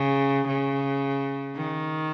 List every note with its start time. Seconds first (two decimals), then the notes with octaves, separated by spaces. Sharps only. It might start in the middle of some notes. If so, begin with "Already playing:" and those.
Already playing: C#3
0.48 C#3
1.55 D#3